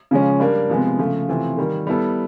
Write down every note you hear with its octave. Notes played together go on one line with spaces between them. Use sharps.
C#3 F3 G#3 C#4
G3 A#3 D4
C3 F3 G#3 B3
C#3 F3 A3
C3 E3 A3 C4 F4
D#3 G3 A#3
G3 B3 E4 A4